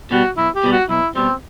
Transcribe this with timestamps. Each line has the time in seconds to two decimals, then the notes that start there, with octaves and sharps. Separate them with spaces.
0.11 B2 G3 F#4
0.37 B1 E4
0.55 G4
0.64 B2 G3
0.72 F#4
0.89 B1 E4
1.15 B2 G3 C4